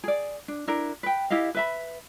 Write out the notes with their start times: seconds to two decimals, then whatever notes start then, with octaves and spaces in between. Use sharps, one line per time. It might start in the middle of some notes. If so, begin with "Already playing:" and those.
0.04 G#4 D5
0.48 D4
0.68 D4 E4 A#4
1.03 B4 G5
1.30 E4 G4 D#5 F5
1.55 B4 E5 B5